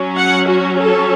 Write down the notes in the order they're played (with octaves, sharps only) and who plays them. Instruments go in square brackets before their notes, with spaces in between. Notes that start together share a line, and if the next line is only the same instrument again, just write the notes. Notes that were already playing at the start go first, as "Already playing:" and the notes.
Already playing: [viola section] F#3 C#4
F#5
F#4
A4